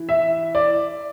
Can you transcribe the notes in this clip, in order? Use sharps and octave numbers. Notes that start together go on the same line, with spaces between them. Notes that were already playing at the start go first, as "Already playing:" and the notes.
Already playing: E3
E5
D5